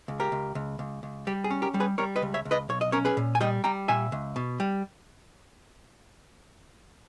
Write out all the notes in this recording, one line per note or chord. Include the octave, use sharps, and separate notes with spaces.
C#2
G4 A#4
C#2
C#2
C#2
C#2
G3 G4
G#4
C#4
G4 A#4
G3
G#4 B4
G3 A#4 C#5
B4 D#5
C#2
C#5 E5
C#2
B4 D#5
B1 C#5
D#5
C#4 A#4 C#5
G#4 B4
A#2
G#5
G3 D#5 G5
G3 G5 A#5
A#2 E5 G#5
C#2
B2
G3